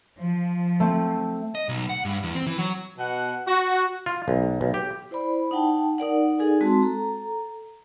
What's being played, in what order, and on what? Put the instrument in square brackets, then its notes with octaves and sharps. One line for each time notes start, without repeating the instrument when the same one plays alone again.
[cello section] F3
[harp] A3 C4
[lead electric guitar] D#5
B1
F#5
G2
E2
C4
E3
F#3
[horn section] B2 F#5
F#4
[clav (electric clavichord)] F4
B1
B1
G4
[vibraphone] E4 C5 D5 B5
D#4 F#5 G5 A5
D#4 A#4 D5 F#5
D#4 G#4 A4 G#5
G#3 C4 F#4 A5 C6
A4 A#5